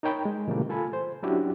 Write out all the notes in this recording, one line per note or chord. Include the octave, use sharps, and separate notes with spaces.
D#4 A#4 C#5 G5 B5
G#3
A#2 C#3 E3 G3 A3 A#3
F4 A4 G#5 B5
C5
F#3 C#4 D4 E4 F#4 G4